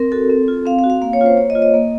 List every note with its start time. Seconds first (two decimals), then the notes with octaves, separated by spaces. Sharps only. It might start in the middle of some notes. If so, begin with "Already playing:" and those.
Already playing: C4 A#4
0.12 F#4 A4
0.30 C4
0.48 F4
0.66 C4 F5
0.79 F5
0.84 F#4
0.90 F5
1.02 A#3 F5
1.13 C#5
1.20 C#4 F4
1.26 C5
1.37 A#3 C#5
1.50 D#5
1.55 F4
1.62 D#5
1.74 A#3